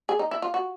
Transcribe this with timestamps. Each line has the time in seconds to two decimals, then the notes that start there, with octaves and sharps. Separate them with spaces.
0.09 G#4
0.19 D#4
0.31 E4
0.42 F4
0.54 F#4